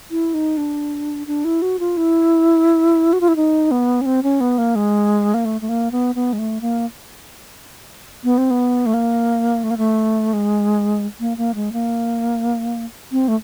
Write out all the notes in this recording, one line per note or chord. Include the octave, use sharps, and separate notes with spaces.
E4
D#4
D4
D4
E4
F#4
F4
E4
F#4
F4
E4
D#4
B3
C#4
C4
C#4
B3
A#3
G#3
A#3
A3
A3
A#3
B3
B3
G#3
A3
A#3
B3
C4
B3
A3
A#3
A3
A#3
A3
G#3
A#3
A#3
G#3
A#3
C4
A3